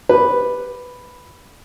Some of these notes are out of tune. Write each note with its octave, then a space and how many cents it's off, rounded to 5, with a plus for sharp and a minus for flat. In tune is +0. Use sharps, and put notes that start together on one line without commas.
G4 +0 B4 +0